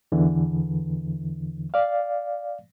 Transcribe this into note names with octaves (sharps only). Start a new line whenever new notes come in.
E2 D3 E3
D5 F5